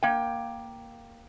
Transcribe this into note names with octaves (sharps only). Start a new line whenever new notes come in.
A#3 G5